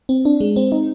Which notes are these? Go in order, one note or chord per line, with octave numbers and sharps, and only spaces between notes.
C4
D4
G#3
C4
D#4